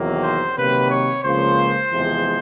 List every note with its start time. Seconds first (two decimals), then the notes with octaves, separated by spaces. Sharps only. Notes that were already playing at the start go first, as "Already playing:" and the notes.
Already playing: E2 C3 D#3 F#3 A#3
0.24 C5
0.57 C3 D#3 F#3 A#3 B4
0.90 C#5
1.24 C#2 C#3 F3 A#3 C5
1.91 E2 C3 F3 G#3